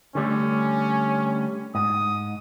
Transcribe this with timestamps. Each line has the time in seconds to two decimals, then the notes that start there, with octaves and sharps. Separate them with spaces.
0.15 D3 G3 A3 C#4
1.75 G#2 D#6